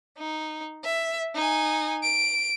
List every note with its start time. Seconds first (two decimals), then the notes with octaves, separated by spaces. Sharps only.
0.18 D#4
0.84 E5
1.35 D#4 G#5
2.03 D7